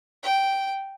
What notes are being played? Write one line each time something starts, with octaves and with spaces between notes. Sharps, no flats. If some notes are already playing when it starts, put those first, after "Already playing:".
G5